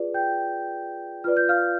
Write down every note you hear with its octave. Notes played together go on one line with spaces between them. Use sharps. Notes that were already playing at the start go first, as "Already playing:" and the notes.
Already playing: F4 G#4 B4 D5
G5 G6
F4 B4 D5 F6
G6
F5 F6